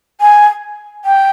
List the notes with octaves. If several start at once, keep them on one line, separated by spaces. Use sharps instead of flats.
G#5
G5